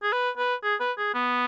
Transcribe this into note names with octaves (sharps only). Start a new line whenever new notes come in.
G#4
B4
B4
G#4
B4
G#4
B3